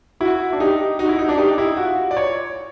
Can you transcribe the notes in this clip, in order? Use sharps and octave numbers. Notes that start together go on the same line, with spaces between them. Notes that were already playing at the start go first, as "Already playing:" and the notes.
E4 F#4
D4
D#4 G4
D#4 F#4
E4
D#4
D4
D#4 G4
E4
F4 F#4
D5
C#5